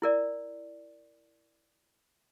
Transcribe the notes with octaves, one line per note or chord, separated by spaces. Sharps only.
E4 A#4 D5